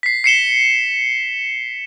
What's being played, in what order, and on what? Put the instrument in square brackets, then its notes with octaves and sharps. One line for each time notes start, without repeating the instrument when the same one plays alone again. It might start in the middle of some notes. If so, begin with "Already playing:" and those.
[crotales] B6 C7
C7 C#7 E7 G7